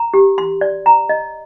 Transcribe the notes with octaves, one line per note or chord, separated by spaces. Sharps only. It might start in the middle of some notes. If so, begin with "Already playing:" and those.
Already playing: A#5
G4
C6
D5
A#5
D#5